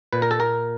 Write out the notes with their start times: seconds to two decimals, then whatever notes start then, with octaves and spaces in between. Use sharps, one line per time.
0.13 A#2 B4
0.22 A#4
0.31 A4
0.40 A#4